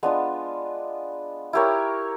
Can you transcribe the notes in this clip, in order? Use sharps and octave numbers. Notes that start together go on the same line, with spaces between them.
G#3 B3 D4 F4
E4 G4 A#4 C#5